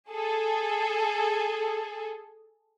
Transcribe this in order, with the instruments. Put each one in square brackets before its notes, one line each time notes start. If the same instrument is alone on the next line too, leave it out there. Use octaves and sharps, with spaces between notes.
[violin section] G#4 A4